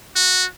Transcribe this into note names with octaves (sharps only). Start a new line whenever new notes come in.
F#4